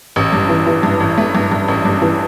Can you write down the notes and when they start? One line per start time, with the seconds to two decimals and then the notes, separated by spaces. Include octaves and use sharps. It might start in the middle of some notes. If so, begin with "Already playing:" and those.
0.16 A1
0.32 G2
0.49 E3
0.67 E3
0.83 G2
1.00 A1
1.18 A3
1.35 G2
1.51 G2
1.68 A1
1.85 G2
2.02 E3